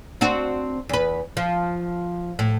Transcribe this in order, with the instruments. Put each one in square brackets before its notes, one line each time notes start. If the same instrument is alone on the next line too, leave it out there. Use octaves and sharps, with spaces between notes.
[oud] C4 D4 F#4
E2 B4
F3
A2